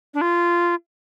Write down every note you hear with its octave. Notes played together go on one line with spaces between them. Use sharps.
D4
F4